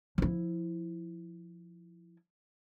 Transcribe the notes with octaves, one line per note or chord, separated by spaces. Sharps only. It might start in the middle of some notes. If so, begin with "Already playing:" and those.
F3 E4